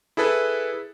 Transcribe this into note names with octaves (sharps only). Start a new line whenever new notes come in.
E4 G#4 A4 B4